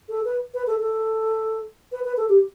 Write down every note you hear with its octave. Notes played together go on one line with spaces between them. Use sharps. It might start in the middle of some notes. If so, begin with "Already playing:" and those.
A4
B4
B4
A4
A4
B4
B4
A4
G4